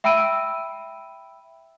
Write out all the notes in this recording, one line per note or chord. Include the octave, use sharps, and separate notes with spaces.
E5 G5 B5 E6 D7 D#7